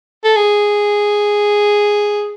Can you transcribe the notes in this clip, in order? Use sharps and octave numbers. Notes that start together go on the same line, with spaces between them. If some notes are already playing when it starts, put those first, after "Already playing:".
A4
G#4